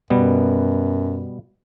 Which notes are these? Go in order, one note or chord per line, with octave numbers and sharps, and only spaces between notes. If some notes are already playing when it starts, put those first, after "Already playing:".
F#2 B2 G3 B3